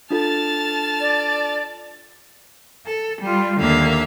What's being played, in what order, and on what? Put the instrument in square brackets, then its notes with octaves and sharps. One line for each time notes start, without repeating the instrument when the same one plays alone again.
[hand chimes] D4 F4 A4 [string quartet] A5 F6 A6
[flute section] D5
[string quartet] A4
G3 F4
D#2 D3 A#3 E5 F5